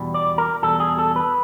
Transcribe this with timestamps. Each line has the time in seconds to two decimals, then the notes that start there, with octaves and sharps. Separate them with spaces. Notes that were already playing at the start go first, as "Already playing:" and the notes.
Already playing: E2 B2 G3
0.14 D5
0.38 A#4
0.62 E2 B2 G3 A4
0.80 G#4
0.99 A4
1.16 B4